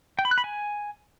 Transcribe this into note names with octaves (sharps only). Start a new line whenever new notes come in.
G5
B5
F#6
B5
G#5